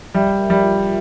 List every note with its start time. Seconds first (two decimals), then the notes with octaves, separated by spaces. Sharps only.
0.14 G3 E5
0.38 A#4
0.50 G3
0.63 F4